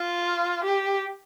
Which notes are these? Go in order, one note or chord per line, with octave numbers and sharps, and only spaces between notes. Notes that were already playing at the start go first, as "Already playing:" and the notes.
Already playing: F4
G4